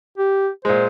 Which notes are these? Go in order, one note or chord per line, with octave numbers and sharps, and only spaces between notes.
G4
A#2 G#3 C5